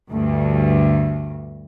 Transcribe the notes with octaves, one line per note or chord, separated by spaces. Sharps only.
D2 G2